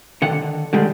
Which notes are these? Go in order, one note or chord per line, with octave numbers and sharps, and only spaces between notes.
D3 D#3 F#5
D3 D#3 G3 G#3